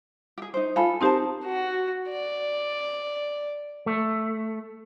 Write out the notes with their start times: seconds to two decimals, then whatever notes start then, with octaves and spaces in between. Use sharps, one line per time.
0.38 G4 G#4
0.54 D#4 C5
0.76 F4 A4 F5 G#5 B5
1.01 C4 D#4 G4 A#4 C5 A5
1.45 F#4
2.10 D5
3.86 A3